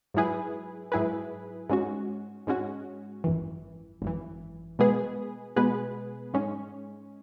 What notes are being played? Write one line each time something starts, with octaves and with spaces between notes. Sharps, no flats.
G#2 F#3 E4 G#4 B4
G#2 F#3 E4 G#4 B4
G#2 G#3 C#4 F#4
G#2 G#3 C#4 F#4
G#1 F#2 E3
G#1 F#2 E3
B2 G#3 B3 G#4 B4
B2 G#3 B3 G#4 B4
G#2 G#3 C#4